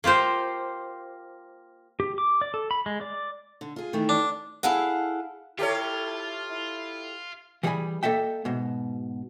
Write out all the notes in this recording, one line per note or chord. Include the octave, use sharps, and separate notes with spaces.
A#3 F4 G4 C5
G4
D6
D5
A4
B5
G#3
D5
D3
F4 G#4
D#3 E3 A3
D4
E4 G#4 A4 F5 F#5
E4 F4 G4 A4 C#5
E4
E3 G3 G#4 F5 G#5 B5
A#3 A4 D#5 E5 G5
G#2 B2